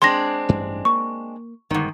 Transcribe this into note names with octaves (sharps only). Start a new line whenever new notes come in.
G#3 C4 D4 C6 A#6
A1 G2
A#3 C#6
G1 G#2 D#3